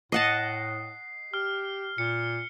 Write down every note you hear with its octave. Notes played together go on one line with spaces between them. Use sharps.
A2 D#5 F#5 A5 C7
G4 F6
A#2 C#7